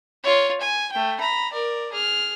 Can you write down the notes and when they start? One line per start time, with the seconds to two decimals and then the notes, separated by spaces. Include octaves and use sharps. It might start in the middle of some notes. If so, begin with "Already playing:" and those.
0.24 F4 C#5
0.61 G#5
0.92 A3 G5
1.20 A#5 B5
1.52 A#4 D5
1.92 G#4 F6